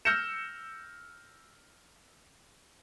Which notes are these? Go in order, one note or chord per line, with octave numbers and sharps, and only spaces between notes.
E6 F6 G6 A#6 C#7 E7